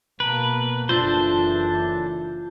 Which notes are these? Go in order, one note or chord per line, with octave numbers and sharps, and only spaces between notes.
B2 A#3 B4 A5 A#5 D7
F#1 E3 D4 F4 A4 C5